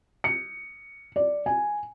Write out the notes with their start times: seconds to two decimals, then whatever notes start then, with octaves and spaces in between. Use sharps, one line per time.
0.24 C#7
1.16 D5
1.46 G#5